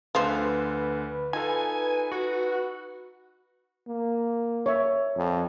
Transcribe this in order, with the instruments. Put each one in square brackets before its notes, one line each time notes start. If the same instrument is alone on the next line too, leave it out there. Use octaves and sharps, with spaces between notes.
[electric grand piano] D2 D3 [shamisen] F3 C5 [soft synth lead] B4
[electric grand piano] D#4 F4 A4 [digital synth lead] G#5
[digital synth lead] F#4
[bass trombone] A#3
[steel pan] C#5 E5
[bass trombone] F2